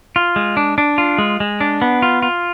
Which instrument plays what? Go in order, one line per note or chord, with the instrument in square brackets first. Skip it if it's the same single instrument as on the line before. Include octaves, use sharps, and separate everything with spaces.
[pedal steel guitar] F4
G#3
D4
D4
F4
G#3
G#3
D4
B3
F4
F4